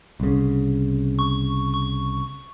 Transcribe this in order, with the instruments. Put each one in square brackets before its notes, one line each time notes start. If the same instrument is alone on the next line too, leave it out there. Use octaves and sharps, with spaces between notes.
[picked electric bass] C2 C#3
[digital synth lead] C#6
C#6